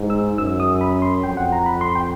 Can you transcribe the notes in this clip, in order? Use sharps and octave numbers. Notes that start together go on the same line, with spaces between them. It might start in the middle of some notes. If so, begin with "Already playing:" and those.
Already playing: G#2
E6
F#2 E6
D#6
B5
C6
F2 G5
F#5
A#5
B5
C6
G5